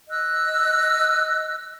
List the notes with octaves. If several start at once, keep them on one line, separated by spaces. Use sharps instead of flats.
D#5 E6 F#6